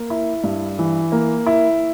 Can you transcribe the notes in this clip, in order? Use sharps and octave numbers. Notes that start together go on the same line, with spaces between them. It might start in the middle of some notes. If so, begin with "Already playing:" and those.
Already playing: A#3
E4
G2
E3
A#3
E4